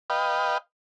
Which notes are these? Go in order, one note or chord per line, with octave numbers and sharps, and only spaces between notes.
B4 D#5 F5 G5